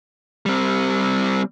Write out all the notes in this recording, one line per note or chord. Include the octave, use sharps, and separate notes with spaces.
G3 C4